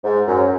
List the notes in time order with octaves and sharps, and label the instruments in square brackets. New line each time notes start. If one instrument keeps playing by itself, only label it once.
[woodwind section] G#2
F#2